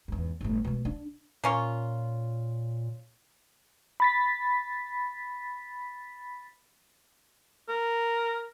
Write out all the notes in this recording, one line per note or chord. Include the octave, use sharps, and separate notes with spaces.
E2 G#2
G1 A2
B2 G#3
D4
A#2 A#3 C#4 F4
B5 A6 B6
A#4